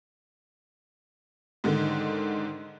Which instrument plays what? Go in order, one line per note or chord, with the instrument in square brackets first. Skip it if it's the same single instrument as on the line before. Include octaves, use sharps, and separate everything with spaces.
[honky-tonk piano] G#2 D3 D#3